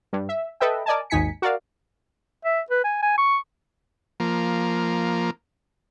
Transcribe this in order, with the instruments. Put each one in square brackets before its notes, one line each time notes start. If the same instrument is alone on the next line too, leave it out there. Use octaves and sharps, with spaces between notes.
[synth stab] G2
E5
A4 B4 D#5 E5 G5
A#4 D5 D#5 G#5 A5
G#1 D#2 D#4 G#5 B6 C#7
F#4 A#4 D5 F5
[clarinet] E5
B4
G#5
G#5
C#6
[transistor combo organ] F3 A#3